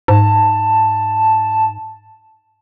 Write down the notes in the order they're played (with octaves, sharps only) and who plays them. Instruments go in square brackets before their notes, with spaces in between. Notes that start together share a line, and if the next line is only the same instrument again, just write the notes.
[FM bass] G#2 [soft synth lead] A5